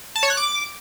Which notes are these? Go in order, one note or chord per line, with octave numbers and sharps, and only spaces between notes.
A5
C#5
F#6
D6